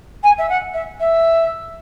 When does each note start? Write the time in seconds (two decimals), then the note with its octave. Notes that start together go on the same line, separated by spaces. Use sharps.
0.23 G#5
0.38 E5
0.49 F#5
0.73 E5
1.00 E5